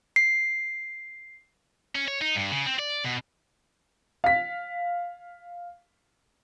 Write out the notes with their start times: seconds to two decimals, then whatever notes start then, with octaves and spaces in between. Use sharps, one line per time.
0.16 C7
1.95 C#4
2.08 C#5
2.22 D#4
2.36 G2
2.52 C#3
2.67 C4
2.79 D5
3.05 B2
4.24 F5 B6